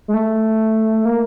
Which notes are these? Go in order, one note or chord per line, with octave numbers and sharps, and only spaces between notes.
G#3
A3
A#3